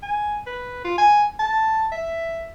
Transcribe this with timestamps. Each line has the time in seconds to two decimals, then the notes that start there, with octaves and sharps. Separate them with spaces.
0.03 G#5
0.46 B4
0.84 F4
0.98 G#5
1.39 A5
1.92 E5